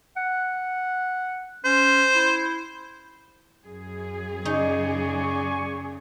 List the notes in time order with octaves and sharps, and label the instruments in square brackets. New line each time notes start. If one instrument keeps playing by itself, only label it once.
[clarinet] F#5
[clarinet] C#4 [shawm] C5
[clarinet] E4
[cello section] F#2 G#4
[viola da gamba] C#3 [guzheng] D#4 [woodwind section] D5 G#5 C#6